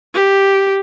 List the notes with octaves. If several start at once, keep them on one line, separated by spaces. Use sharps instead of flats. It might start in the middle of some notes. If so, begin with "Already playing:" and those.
G4